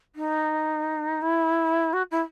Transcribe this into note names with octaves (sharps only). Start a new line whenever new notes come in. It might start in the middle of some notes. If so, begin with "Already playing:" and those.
D#4
E4
F#4
E4